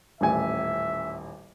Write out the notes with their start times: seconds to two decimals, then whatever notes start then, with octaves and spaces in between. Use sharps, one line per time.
0.21 D#1 A1 E5 G#5